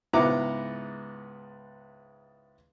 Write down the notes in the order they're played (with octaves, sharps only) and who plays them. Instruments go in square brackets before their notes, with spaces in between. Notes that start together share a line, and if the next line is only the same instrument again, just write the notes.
[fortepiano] C#2 G#2 B3 E4 A#5 D6